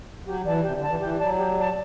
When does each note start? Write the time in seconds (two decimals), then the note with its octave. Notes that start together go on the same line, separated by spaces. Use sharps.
0.25 F#3 G4
0.44 E3 D5 A5
0.62 C3 G4
0.75 D3
0.81 D5 A5
0.88 E3
0.99 E3 G4
1.19 F#3 D5 A5
1.37 G4
1.56 D5 A5